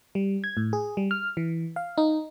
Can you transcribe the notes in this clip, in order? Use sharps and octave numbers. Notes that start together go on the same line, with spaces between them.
G3
G#6
A2
G#4
G3
F6
E3
F5
D#4